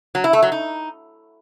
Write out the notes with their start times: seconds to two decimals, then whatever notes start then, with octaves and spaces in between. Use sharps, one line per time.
0.15 F#3
0.24 E4
0.33 A3
0.42 F#3
0.52 D#4